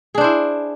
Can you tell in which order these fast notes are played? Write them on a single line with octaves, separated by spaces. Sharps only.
G#4 D4 C5 E4